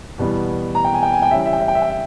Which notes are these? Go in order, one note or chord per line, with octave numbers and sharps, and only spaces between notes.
E2 B2 G3 B3
A#5
G5
G#5
G5
G#5
G5
C#3 E3 G3 C#4 E5
G5
E5
G5
E5
G5
E5
G5
E5